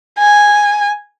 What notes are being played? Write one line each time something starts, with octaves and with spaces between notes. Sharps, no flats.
G#5